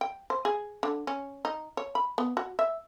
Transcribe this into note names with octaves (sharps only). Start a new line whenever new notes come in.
G5
C5
G#4
D3
C#4
D#4
C#5
B5
B3
F#4
E5